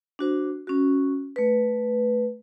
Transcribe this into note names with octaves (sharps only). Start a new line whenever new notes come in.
D4 F#4 C5
C#4 F#4
A3 B4